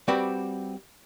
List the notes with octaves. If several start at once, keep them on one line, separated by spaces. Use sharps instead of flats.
G3 C4 F#4 B4 D5